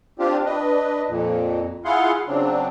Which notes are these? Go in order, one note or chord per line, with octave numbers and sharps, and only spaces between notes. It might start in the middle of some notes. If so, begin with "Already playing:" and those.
C4 D4 F4 G4
D4 B4 D#5
F2 A#2
E4 F4 G#4 F5 F#5 C6
C#3 F#3 C4 D4